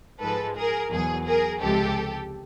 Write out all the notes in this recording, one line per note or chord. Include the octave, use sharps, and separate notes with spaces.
G#2 F3 G#3 A4 B4
G#4 A#4
E2 B2 F#3 G#4
G#4 A#4
C#2 C3 F3 G#3 G4 A4